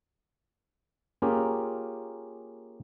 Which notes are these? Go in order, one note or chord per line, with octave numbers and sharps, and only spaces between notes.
A#3 C#4 F4 G4 G#4 A#4